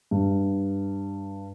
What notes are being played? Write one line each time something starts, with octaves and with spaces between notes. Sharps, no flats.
G2